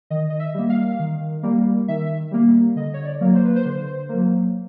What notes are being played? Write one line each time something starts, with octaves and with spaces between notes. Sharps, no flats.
D#3 D#5
D#5
E5
G3 A#3
F5
D#3
G3 A#3
D#3 E5
G3 A#3
D3 D#5
C#5
D5
F#3 A#3
C5
B4
C5
D3
F#3 A#3